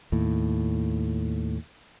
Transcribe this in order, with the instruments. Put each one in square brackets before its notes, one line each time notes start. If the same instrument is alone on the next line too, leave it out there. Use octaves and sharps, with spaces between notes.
[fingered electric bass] D#2 A2